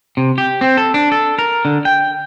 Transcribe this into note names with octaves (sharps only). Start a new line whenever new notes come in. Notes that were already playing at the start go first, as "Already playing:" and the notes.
C3
G4
C4
A4
D4
A4
A#4
D3
G5